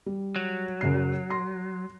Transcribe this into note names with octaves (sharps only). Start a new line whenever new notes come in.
G3
F#3
F#2 C#3 C7
C6 A#6 C7